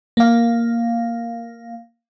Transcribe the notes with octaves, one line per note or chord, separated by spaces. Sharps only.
A#3 F5